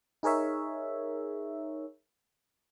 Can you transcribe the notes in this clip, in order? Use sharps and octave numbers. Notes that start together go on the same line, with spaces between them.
D#4 G#4 A#4 C#5 E5